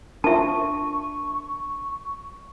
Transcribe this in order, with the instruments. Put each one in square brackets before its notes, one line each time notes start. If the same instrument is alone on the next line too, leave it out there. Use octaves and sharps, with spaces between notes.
[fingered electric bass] D4 [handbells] F4 A#4 [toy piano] E5 A5 [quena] C#6